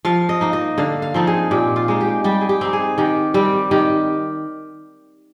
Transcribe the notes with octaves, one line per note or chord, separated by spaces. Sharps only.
F3 F5
D#5
A#3 D#4
D#5
D3 F5
F5
F3 C4 D#4
G#4
A#2 G4
F4
G#3 D#4
G4
G3 G4
G#4
G4
C4 D#4
G#4
D#3 G4
G3 C4 G4
D#3 G4